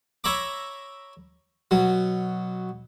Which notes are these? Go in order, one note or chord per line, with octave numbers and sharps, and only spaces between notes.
C#5 E5 A#5 B5 D6
B2 F#3